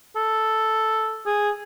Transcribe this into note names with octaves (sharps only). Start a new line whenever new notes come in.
A4
G#4